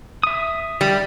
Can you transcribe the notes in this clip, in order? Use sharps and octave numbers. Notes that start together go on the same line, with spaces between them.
E5 D#6
G3 G4